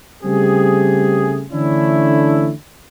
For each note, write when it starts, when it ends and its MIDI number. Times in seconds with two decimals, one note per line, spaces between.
0.23 1.44 49
0.23 1.44 55
0.23 1.44 57
0.23 1.44 60
0.23 1.44 67
0.23 1.44 68
1.52 2.51 50
1.52 2.51 52
1.52 2.51 57
1.52 2.51 61
1.52 2.51 62
1.52 2.51 64